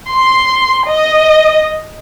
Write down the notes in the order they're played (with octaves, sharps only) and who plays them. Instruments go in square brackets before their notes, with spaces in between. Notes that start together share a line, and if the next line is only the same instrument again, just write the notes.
[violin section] C6
D#5